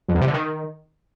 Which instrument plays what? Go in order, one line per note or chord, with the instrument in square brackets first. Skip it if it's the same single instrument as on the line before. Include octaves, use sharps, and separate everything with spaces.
[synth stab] F2
E2
C3
D3
D#3